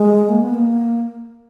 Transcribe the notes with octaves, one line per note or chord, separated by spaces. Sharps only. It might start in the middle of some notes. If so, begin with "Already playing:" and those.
Already playing: G#3
A#3
B3
A#3